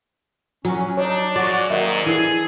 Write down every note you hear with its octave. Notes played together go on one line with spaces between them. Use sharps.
F#3 C#4
D4 D#4 C#5
G#2 F#4 D5
G#2 D#3 F#3 A#3 A#4 D#5 E5
E3 G#4 A4